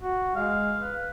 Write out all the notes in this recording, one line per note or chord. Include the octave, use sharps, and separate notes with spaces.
F#4
G#3 F5
B4